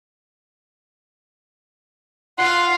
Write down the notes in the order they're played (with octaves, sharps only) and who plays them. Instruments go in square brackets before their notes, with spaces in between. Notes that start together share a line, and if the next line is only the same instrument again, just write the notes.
[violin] F4 F5 [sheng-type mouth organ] F#5 C6